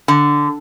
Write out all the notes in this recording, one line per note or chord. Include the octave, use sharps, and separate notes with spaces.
D3